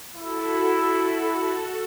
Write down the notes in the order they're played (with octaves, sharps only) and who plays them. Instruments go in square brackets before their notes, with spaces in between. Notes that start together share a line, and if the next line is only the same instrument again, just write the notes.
[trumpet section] E4 [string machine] F#4 A4